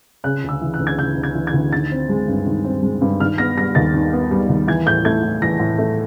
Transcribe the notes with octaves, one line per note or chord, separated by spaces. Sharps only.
C#3 F#6
D2
E6
E3
F#6
D2
G#6
C#3 G6
D2
G#6
E3
G#6
D2
D#3 A6
C4
G#3
G2
D#3
C4
G#3
G2
D#3 F6
B3 A#6
G3 A#6
D#2 A6
D#3
B3
G3
D#2
E3 G#6
A2 G6
A3 G#6
A2
E3 A#6
A2
A3